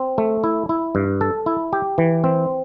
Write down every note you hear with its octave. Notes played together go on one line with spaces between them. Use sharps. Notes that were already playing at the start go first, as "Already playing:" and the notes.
Already playing: C4
A3
E4
E4
G2
A4
E4
G4
E3
C4